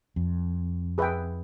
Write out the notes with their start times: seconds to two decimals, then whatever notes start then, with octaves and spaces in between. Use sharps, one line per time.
0.16 F2
0.98 G#4 B4 E5 G5